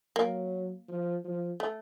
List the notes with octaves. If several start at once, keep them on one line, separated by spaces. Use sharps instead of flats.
F#3 A#3
F3
F3
A3